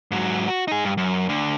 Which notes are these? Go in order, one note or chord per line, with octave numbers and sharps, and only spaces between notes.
G#2 F#3
F#4
D#4 G#4
G2
F#2
D2 D3